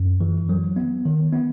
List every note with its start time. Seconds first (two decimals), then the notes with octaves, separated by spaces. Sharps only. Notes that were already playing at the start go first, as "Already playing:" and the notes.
Already playing: F#2
0.20 E3
0.49 F#3
0.76 B3
1.05 D#3
1.32 B3